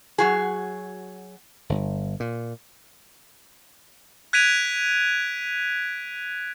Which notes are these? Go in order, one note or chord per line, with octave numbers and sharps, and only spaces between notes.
F#3 F#4 G#4
G1
A#2
F#6 G#6 B6 D7 D#7 F7